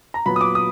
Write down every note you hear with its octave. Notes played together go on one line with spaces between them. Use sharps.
A#5
A#2 F#3 B3 B5
D#6
D6
D#6